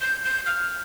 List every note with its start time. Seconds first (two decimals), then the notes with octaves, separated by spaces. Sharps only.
0.01 G6
0.25 G6
0.46 F6